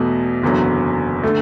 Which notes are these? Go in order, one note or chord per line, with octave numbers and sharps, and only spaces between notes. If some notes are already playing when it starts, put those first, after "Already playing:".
Already playing: E2 B2 A3
F#1 E2 D3 F#3
D3 A3